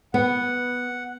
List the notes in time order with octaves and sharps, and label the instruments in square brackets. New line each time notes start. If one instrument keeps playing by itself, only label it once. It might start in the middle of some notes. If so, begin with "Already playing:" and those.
[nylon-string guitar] B3 [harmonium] F#5